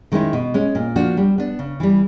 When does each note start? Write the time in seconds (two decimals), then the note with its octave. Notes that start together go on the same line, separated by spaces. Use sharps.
0.12 D#3 G#3 C#4 E4
0.33 B2
0.54 G#3 C#4
0.75 A#2
0.96 F3 A#3 D4 F#4
1.17 G3
1.38 B3 D4
1.59 C#3
1.80 E3 G3